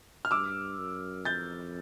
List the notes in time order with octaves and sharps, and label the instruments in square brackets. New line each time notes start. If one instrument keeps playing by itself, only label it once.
[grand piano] F6
[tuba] G2 [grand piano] D6 E6
[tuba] F#2
[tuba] F2 [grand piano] G6 A6